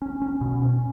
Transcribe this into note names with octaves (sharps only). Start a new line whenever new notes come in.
C#4
C#4
B2
C#4